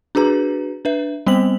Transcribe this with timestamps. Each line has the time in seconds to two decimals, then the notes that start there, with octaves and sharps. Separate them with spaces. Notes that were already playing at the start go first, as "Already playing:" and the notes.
0.15 D4 F#4 G#4 B4 A#5
0.85 D4 B4 E5
1.26 G3 B3 C4 C5 B6 F#7